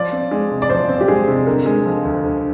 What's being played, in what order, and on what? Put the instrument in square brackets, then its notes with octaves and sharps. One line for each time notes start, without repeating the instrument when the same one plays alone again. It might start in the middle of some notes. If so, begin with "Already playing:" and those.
Already playing: [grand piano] F3 [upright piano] D5
[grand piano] C4
G#3
C3
[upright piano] D5
[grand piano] F3 [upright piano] C5
[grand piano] C4
[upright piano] G4
[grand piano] G#3 [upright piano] G#4
[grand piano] C3
[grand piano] D3 [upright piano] A#4
[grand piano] G#3
F3
D2
D3